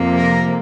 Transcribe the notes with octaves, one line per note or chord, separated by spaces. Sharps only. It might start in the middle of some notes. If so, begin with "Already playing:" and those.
Already playing: F2 C3 F3 A#3
A#4